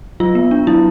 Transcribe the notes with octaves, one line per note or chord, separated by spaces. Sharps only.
F#3 F4
B3
D4
F#3 E4